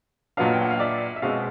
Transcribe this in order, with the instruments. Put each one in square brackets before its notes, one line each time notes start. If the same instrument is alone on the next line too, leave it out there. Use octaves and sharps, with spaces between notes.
[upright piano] A#2 F#3 B3 D4 D#5 F5
G5
F#5
F5
D5 E5
E5
B2 G#3 C4 D#5 F5